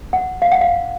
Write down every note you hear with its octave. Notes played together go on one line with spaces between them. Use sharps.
F#5
F5
F#5
F5